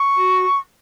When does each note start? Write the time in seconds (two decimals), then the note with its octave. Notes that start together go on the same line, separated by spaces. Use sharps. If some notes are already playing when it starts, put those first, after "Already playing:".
Already playing: C#6
0.16 F#4